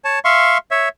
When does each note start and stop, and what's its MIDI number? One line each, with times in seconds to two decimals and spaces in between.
0.05 0.19 73
0.05 0.19 81
0.25 0.58 76
0.25 0.58 77
0.25 0.58 84
0.25 0.58 85
0.71 0.89 73
0.71 0.89 76